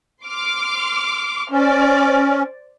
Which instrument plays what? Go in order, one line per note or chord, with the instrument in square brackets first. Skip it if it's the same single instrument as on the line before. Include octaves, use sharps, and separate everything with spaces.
[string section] C6 D6 F6
[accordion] C#4 [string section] C5 D5